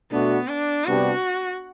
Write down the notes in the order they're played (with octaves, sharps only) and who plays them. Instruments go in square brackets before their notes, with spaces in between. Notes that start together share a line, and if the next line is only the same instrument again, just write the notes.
[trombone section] B2 A3 D4 F#4 [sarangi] B3
[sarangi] D4
[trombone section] C3 G3 B3 D4 G4 [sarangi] F#4